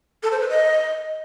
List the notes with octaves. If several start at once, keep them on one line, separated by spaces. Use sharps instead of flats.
A4
C5
B4
D#5